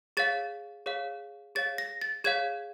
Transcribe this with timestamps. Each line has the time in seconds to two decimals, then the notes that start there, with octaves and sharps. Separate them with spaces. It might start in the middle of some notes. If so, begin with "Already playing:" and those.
0.17 G#4 C#5 F5 A6
0.86 G#4 C#5 F5
1.55 G#4 C#5 F5 A6
1.78 A#6
2.01 A6
2.24 G#4 C#5 F5 G#6